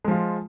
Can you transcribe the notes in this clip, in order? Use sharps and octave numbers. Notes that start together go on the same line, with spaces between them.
F3 G#3 F4